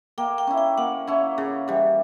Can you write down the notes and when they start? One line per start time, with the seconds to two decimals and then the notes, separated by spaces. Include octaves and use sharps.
0.18 A#3 G5
0.38 G5
0.47 C#4 E4
0.58 G5
0.78 A#3 F#5
1.07 C#4 E4
1.38 C#3
1.68 E3 G3